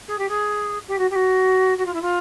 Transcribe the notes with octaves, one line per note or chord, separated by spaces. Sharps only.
G#4
G4
G#4
G4
F#4
G4
F#4
F#4
F4
E4
F4